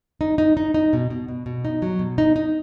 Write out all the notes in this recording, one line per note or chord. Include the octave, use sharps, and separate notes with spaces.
D#4
D#4
D#4
D#4
B2
B2
B2
B2
D#4
F#3
B2
D#4
D#4